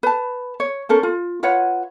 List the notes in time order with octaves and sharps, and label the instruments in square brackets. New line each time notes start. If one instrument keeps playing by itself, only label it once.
[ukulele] B4 A5
C#5
C#4 A4 A#4 C5
F4
F4 B4 C#5 F#5